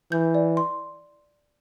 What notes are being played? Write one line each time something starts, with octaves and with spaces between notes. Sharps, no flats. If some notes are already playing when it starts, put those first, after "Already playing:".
E3 G6
D5
C6